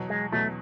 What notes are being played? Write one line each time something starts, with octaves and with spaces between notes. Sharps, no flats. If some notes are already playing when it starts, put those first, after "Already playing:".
Already playing: E2 B2 F#3
G#3
E2 B2 F#3 A3